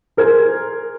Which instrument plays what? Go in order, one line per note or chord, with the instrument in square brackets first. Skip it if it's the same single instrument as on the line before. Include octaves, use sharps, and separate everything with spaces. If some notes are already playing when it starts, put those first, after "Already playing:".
[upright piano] G#4 A#4 C5 G#6